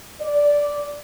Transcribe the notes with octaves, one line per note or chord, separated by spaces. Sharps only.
D5